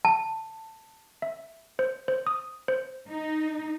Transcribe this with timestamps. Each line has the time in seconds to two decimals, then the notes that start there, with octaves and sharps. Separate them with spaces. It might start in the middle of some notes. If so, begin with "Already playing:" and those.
0.05 A5
1.22 E5
1.79 C5
2.08 C5
2.27 D#6
2.68 C5
3.10 D#4